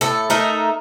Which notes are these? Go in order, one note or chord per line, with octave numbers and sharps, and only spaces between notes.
A2 A4
A3 D#4 A4 A#4